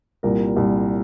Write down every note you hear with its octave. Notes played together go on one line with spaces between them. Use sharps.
C2 A#2 G3 A#4
C2 A#2 G3